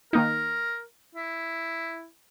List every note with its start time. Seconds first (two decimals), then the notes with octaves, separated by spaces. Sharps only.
0.13 D#3 A#3 D#4 A#4
1.15 E4